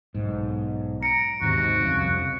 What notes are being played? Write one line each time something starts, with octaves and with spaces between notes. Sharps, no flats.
B1 G#2
A#5 C#7 D7
D#2 G#2 C3 F#4
C2 F2 C#3